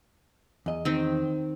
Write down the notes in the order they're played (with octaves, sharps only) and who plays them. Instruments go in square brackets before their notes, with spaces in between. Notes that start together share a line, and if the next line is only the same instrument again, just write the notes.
[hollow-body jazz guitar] E2 D#5
[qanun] D#3 C4